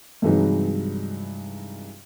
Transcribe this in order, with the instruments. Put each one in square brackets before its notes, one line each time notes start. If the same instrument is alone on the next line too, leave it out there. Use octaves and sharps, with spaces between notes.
[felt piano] G2 C3 E3 F#3 G#3 D#4